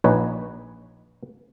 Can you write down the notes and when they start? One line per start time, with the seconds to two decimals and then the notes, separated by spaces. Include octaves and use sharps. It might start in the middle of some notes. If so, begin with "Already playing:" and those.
0.04 A#1 D#4 B4 C#5